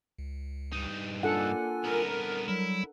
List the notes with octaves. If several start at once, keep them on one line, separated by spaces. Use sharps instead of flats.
C#2
G2 D#4
A#3 D4 F4 A4 F#5 G#5
C2 B3 A#4
F#3 G3 E4